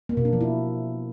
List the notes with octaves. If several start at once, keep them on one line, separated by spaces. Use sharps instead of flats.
A#3
B2
D4
F3
E4